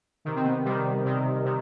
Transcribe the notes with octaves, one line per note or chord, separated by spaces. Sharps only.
C3 D#3
C4
B3
C3 D#3 G3
C3 D#3
C3 D#3